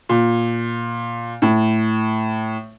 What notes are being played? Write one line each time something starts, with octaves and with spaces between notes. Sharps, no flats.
A#2
A2